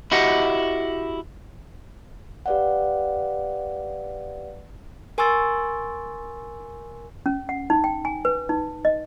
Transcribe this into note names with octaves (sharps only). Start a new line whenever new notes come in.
E4 F#4 G4 D#5 F#5
G4 B4 D5 F5 F#5
A#4 G#5 C6 C#6 E6 A6
C#4
F#5
D#4
G5
G#5
B4
D#4
D#5